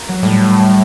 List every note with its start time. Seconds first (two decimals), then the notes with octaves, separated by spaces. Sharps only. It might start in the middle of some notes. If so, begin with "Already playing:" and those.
Already playing: A#3
0.08 F#3
0.23 A2 G3